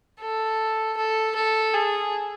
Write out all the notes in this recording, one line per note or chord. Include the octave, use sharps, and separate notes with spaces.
A4
A4
A4
G#4